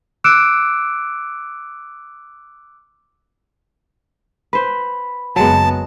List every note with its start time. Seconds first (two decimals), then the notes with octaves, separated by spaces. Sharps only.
0.24 D6 E6 F#6 C#7 D7 E7
4.53 B4 C5 B5
5.36 F#1 F#3 G#3 B3 A5